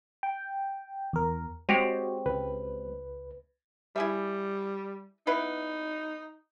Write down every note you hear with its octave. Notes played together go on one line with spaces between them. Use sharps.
G5
E2 A#4
G#3 C4 F#4 G4 C#5
C#2 B4
G3 E4 G#4 E5
B3 D#4 E4 B4